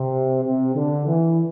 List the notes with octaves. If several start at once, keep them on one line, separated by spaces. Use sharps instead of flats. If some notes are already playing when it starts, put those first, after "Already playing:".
Already playing: C3
C3
D3
E3